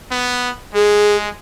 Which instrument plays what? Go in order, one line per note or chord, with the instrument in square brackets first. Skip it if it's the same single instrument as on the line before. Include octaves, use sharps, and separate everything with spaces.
[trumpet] B3
[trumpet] G#3 [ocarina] G#4